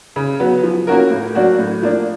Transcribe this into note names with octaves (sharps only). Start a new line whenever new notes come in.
C#3
F#3 B3
F3
A#3 C#4 F#4 A#4
A2
F#3 A#3 D4 F#4
A2
F3 A#3 D4